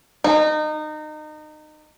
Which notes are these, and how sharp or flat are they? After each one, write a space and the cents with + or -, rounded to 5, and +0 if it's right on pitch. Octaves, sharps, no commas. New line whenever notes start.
D#4 -25